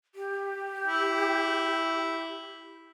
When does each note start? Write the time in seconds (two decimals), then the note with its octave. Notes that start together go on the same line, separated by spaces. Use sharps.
0.15 G4
0.87 E4